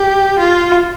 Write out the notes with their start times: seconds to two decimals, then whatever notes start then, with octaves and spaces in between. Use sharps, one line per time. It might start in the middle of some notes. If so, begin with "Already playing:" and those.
Already playing: G4
0.39 F4